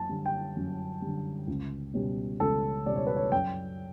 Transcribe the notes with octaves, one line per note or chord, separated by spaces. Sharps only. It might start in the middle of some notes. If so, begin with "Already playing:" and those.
Already playing: F#2 A5
D3 G3
G5
F#2
D3 G3
C#2
B2 G3 C#4
C#2 A4
B2 G3 C#4 D5
C#5
B4
C#5
F#2 G5